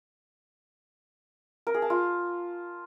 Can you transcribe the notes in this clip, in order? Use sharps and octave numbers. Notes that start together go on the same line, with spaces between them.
A#4
G#4
A5
F4